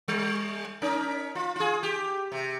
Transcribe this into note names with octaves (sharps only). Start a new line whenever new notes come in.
G3
C#4 D#4 A#4
F4
F4 G#4
G4
C3